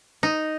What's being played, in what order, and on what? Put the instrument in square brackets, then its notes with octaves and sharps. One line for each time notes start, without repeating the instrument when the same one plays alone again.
[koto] D#4